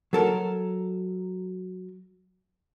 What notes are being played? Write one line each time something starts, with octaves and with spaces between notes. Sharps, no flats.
F#3 A4 A#4